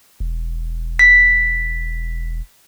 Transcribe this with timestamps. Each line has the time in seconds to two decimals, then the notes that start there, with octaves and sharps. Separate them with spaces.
0.20 E1
0.99 B6